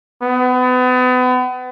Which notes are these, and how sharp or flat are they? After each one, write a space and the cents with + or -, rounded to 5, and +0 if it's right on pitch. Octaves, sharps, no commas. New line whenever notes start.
B3 +35